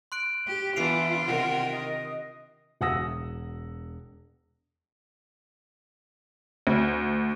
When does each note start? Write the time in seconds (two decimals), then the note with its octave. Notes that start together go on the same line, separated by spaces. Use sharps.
0.12 C6 F#6 D7
0.47 G4
0.76 E3 B3 D4 F4 C7 D7 F7
1.26 C3 D#3 A#4 F#5
1.71 D#5
2.81 E1 F#5 D#6 E6 A#6
6.67 D2